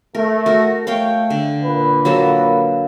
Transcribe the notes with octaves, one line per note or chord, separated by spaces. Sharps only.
A3 A#4
F#4 A#4
A3 C#5 F5 G5
D3
A#2 B4
F#3 A#3 A4